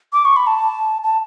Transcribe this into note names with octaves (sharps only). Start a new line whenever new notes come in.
D6
C#6
B5
A5
A5